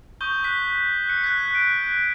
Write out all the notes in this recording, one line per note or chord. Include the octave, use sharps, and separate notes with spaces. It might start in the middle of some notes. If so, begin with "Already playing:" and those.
C#6 D#6 G6 G7
C#6 F#6 B6
F#6 C#7
F#6 G#6 B6
D7